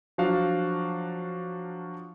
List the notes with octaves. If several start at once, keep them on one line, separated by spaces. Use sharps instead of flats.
F3 F#3 D4 F#4 F5